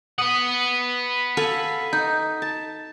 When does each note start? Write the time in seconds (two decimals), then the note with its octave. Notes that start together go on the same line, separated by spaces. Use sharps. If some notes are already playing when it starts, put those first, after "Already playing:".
0.18 B4 F#5 D#6 D#7
1.37 A4 F5 G#5
1.93 D#4 G6
2.42 A5